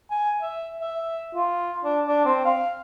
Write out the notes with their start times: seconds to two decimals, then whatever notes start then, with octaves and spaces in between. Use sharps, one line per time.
0.11 G#5
0.42 E5
0.81 E5
1.35 F4
1.84 D4
2.07 D4
2.25 C4
2.45 F5